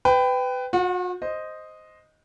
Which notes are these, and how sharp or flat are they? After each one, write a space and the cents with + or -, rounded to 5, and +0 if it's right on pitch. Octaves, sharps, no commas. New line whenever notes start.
B4 +25 G5 +0
F#4 -45 F#5 +0
C5 +0 D#5 +0